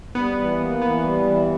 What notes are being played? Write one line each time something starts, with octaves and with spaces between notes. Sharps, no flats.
G3 B3
E3
A#3
E3 B3
G3
E3